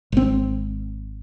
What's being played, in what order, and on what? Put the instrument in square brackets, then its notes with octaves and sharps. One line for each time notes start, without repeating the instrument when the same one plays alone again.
[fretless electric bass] G#1 C4